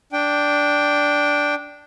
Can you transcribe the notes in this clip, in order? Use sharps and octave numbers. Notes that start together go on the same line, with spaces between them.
D4 G5